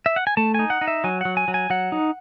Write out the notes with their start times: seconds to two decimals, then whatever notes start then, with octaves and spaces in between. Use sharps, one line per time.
0.06 E5
0.16 F#5
0.27 G#5
0.37 A3 A5
0.54 D#4 G#5
0.70 F#5
0.81 D#4
0.88 E5
1.04 F#3 G#5
1.21 F#3 F#5
1.37 G#5
1.48 F#3
1.54 G#5
1.70 F#3 F#5
1.92 D#4